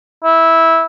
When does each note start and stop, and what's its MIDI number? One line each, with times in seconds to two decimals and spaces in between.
0.24 0.86 64